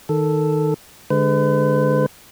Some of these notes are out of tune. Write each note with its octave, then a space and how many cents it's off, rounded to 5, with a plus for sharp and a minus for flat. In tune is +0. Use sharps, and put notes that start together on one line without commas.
D#3 +0 A4 +0
D3 +0 G#3 +0 B4 +45